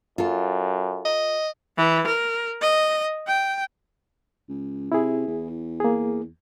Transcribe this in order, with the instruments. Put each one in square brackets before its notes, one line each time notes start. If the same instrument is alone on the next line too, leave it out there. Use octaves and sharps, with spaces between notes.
[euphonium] F#2 [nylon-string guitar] F4 A4
[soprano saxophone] D#5
[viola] E3
A#4
D#5
G5
[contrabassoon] C#2
[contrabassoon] C3 [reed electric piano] E4 G#4
[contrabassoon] E2
[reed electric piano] A#3 G#4